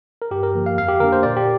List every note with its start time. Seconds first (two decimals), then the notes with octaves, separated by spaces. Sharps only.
0.22 A#4
0.31 G2 G4
0.43 A#4
0.54 D3 F3 A#3
0.66 F5
0.78 F2 F5
0.88 G4
1.00 D3 A#3 D4 A#4
1.12 C5
1.23 A#2 D5
1.37 G4